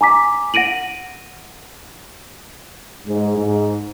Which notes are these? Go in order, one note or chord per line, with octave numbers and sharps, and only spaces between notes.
G#5 A#5 D6 B6
F#5 A#6 D7 D#7 F#7
G#2
G#2